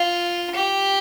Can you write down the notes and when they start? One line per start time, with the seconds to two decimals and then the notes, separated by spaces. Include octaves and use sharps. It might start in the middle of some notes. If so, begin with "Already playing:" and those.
Already playing: F4
0.55 G4